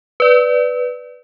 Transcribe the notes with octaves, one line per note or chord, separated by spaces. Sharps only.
B4 D5